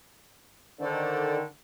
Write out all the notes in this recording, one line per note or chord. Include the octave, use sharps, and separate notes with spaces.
D3 D#3 A4 C5 D5